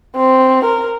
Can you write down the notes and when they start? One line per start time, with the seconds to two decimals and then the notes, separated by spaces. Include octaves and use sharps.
0.16 C4
0.65 A#4